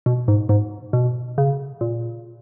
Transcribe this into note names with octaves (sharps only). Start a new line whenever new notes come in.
B2
G#2
G#2
B2
C#3
A#2